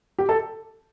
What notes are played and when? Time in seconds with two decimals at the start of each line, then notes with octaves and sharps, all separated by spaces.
0.19 G4
0.29 A4